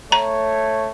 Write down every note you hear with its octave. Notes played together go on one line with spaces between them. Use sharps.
A3 C#5 A#5